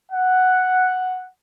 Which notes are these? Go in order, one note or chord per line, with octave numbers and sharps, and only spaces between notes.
F#5